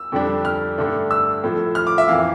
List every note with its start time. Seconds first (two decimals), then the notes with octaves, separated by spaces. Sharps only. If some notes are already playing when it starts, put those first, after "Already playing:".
Already playing: E6
0.12 F2 D3 G3 D4
0.45 F6
0.78 G2 D3 A3 D4
1.11 E6
1.44 A2 F3 A3
1.75 F6
1.87 D6
1.98 E5
2.08 F2 E3 A#3 F5